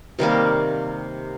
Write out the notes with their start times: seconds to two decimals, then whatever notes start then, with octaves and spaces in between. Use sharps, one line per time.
0.19 C3 D#3 G3 A#3